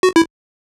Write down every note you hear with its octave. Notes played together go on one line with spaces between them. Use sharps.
F#4
E4